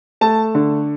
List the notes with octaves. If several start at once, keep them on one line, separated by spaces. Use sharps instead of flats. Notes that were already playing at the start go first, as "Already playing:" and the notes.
A3 A5
D3